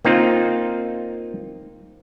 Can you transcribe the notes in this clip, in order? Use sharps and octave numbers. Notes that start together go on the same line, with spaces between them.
A#3 C4 D#4 F4